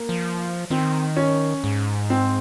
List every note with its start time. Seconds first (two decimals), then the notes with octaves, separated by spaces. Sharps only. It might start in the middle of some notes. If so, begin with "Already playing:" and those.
Already playing: A#3
0.09 F3
0.70 D#3 C4
1.17 C#4
1.64 G#2
2.10 C4